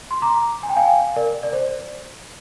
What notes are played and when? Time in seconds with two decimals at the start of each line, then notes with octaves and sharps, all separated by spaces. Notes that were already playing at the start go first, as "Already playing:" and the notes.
0.11 C6
0.22 A#5 D6
0.63 G#5
0.69 G5
0.76 F5 G#5
1.16 A#4 D5
1.43 D5
1.53 C5